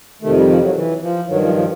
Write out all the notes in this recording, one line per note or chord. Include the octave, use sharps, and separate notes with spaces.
F2 C3 D#3 A3
G3
F3
F#3
E3
F3
G2 D#3 F#3
F3
F3